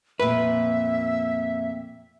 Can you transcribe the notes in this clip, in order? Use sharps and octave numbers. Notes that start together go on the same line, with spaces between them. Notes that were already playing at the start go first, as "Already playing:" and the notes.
F2 A#2 B4 E5